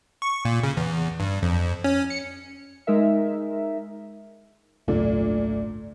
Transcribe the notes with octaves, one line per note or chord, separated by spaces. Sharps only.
C#6
A#2
C#3
E2
G2
F2
C#4
C#7
G#3 D#4 A#4 E5
G#1 C#2 F#2 A#2 A3 D4